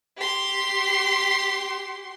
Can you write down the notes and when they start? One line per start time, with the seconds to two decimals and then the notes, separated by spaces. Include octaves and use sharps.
0.17 G4 C6